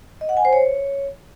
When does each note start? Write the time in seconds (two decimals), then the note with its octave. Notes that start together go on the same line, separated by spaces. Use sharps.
0.21 D#5
0.29 F#5
0.37 G#5
0.45 C5
0.53 C#5